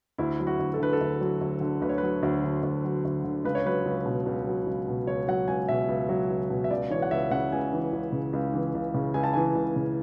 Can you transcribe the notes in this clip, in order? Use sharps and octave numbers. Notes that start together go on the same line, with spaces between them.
D2 E4
F#3
F#4
D2
A4
D3 B4
A4
D2
F#3
D2
D3
D2 B4
C#5
F#3 B4
D2
D3
D2
F#3
D2
D3
C#2 B4
C#5
F#3 B4
C#2
B2
C#2
F#3
C#2
B2
C#2 C#5
F#3 F#5
C#2 G#5
B2 E5
C#2
F#3
C#2
B2
E5
C#2 D5
E3 C#5
F#5
C#2 E5
C#3 F#5
C#2 G#5
E3
C#2
C#3
C#2
E3
C#2
C#3
C#2 G#5
A5
E3 G#5
C#2
C#3